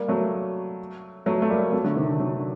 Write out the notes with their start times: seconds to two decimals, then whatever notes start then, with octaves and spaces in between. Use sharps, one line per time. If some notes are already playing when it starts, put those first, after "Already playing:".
Already playing: G3 A#3
0.08 F#3 A3
1.26 F#3 A3
1.42 A3
1.50 G3 A#3
1.72 F#3 A3
1.84 D3 F#3
1.96 C3 D#3
2.08 D3
2.20 D3 F#3
2.39 D3